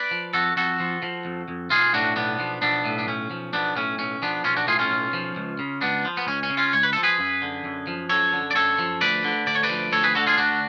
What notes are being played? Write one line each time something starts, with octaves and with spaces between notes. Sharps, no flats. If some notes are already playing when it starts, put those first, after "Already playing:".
Already playing: B4 D5
F3
F2 F#4 A4
F2 F#4 A4
F3
F3
F2
F2
B1 F4 G#4
A2 D4 F#4
B1 B3 D4
F3
B1 B3 D4
A2
D4
B1 C#4
F3
B1 B3 D4
A2 C#4
B1 C#4
F3 B3 D4
B1 C#4 F4
D4 F#4
A2 F4 G#4
C#4 F4
B1
F3
C#2
C#3
C#2 B3 D4
F3
B3
C#2 C#4
C#4
C#3
C#4 F4
C#2 C#5
B4
F3 A4
G#4 B4
F#2
D3
F#2
F3
F#2 A4 C#5
D3
D5
F#2 A4 C#5
F3
D2 B4 D5
D3
D2 D5
C#5
B4 D5
F3
D2 A4 C#5
G#4 B4
D3 F#4 A4
F4 G#4
D2 D4 F#4